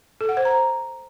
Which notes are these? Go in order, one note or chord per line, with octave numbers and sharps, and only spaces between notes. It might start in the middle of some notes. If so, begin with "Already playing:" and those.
A4
F#5
C5
A#5